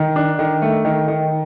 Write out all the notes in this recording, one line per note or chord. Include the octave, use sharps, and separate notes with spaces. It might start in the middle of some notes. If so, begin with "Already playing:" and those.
Already playing: D#3
D4
D#3
A3
D#3
D#3